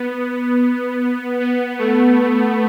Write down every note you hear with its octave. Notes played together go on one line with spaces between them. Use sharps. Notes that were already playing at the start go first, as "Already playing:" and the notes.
Already playing: B3
B3
A3